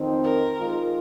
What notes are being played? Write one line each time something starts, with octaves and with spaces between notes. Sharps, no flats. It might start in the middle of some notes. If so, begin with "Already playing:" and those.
Already playing: F2 D#3 C4 D#4
A#4
D#3 G#3 F4